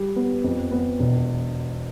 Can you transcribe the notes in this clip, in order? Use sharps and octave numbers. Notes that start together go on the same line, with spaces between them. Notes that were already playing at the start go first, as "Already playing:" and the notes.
Already playing: G3
B3
F2
B3
E1